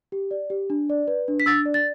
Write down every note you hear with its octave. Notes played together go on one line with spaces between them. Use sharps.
G4
D5
G4
D4
D5
B4
D4
B6
D4 E6 A6
D5
A6